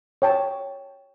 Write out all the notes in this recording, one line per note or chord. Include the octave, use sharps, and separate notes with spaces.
C#5 G5 A5